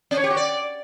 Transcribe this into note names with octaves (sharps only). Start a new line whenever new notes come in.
C#4
C#5
G4
F#4
D5